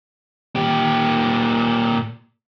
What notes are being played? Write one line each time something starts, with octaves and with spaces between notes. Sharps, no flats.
A#2 G4